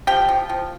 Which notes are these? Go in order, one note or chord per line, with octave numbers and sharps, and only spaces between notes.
F3 G4 G5
F3
F3